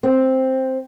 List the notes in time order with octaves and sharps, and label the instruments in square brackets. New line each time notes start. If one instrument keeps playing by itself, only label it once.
[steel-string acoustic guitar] C4